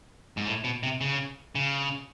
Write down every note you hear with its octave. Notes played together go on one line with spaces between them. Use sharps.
G#2
A2
B2
C3
C#3
C#3